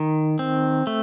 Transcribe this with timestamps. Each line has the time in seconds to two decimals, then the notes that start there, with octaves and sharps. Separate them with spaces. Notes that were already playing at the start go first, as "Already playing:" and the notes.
Already playing: D#3
0.39 C4
0.87 A3